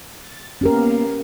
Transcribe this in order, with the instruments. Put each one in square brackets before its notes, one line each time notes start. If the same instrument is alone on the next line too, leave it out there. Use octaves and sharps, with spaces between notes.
[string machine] A6
[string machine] A#3 B3 F5 [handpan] C#4 G4 A#4